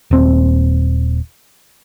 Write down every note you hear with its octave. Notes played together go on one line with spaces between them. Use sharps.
D#1 C4